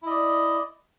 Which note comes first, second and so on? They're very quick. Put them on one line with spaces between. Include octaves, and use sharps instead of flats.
E4 D#5 D5